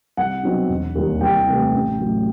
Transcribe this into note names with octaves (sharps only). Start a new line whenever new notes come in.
C2 F#5
B2 F#3 C4 D#4
E1
D#2 D#3 G3
C2 G5
C3 E3 A3
A1
A2 F#3